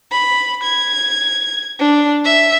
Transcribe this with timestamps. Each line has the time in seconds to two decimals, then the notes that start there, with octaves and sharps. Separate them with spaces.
0.12 B5
0.63 G#6
1.80 D4
2.25 E5